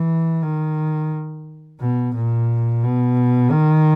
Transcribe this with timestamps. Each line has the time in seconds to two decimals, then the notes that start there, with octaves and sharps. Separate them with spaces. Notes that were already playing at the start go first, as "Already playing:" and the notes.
Already playing: E3
0.42 D#3
1.81 B2
2.15 A#2
2.83 B2
3.52 D#3